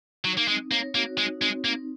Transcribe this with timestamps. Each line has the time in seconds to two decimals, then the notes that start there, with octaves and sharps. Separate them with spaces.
0.25 F#3 D#4
0.37 A#3
0.48 G#3 C4
0.71 A#3 C#5
0.95 A#3 F#4
1.18 G#3 D#4
1.42 G#3 C4
1.65 A#3 D#4